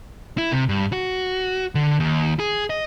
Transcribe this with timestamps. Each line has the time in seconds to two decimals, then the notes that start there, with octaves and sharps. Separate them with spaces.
0.38 E4
0.52 C3
0.69 G2
0.93 F#4
1.75 D3
2.00 D#2
2.39 G#4
2.70 D#5